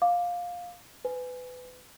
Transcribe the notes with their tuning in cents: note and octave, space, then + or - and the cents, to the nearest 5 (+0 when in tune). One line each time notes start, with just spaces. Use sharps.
F5 +15 D6 +0
B4 +25 G#5 +0